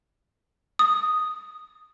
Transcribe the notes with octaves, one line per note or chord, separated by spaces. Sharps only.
D#6